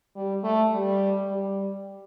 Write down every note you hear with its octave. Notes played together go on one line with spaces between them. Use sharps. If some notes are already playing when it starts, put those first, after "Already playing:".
G3
A3
G3
G3